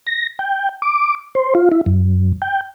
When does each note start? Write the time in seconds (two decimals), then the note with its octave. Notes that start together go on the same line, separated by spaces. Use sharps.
0.07 A#6
0.39 G5
0.82 D6
1.35 C5
1.55 F4
1.72 E4
1.86 F#2
2.42 G5